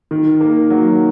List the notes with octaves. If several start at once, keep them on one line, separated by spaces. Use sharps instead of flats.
D#3
A#3
F#3